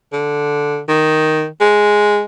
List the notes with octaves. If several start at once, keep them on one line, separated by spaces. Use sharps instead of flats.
D3
D#3
G#3